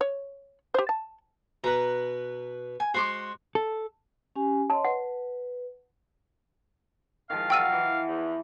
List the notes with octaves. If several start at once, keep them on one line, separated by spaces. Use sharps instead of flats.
C#5
G4 C5
A5
B2 B4 A#5
G#5
G#3 F#4 C5 C6 D6
A4
C#4 G4 G#5
C#5 D#5 A5 C6
B4 F#5
D#3 F3 G#3 F5
F#3 F4 G5 E6 D#7
E3
E2